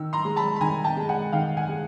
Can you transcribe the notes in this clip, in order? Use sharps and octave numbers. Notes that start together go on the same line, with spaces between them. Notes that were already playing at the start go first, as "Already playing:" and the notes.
Already playing: D#3 E6
A#5 C6
G#3
A5 B5
B5
D#3 G#5 A#5
G5 A5
G#3
F#5 G#5
D#3 F5 G5
F#5 G#5
G#3